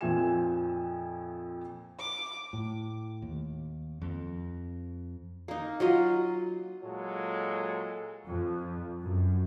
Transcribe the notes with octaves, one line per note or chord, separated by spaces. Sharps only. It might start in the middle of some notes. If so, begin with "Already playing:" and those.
F2 A#2 F3 E5 G#5 E7
D6
A2
D#2
F2
A#3 D#4
F#3 F4 D#5
A#2 F#3 G#3 A4
F2
F#2